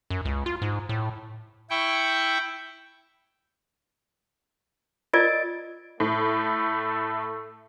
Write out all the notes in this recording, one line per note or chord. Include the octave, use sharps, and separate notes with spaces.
F#2
C#2
F4
G#2
A2
E4 G5 C#6
F4 A#4 D5 D#5 A6 D7
A2 A3